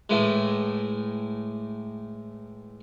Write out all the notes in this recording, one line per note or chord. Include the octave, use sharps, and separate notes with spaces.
A2 E3 G#3